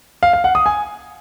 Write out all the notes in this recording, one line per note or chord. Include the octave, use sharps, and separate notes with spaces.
F5
F5
F#5
D#6
G#5